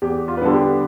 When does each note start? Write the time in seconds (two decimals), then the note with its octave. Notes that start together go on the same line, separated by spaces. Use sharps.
0.02 E2 G4
0.28 F4
0.37 B4
0.41 D3 G3 B3 D4 A4
0.54 G4